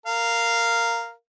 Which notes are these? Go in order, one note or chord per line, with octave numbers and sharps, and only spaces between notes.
A#4 F5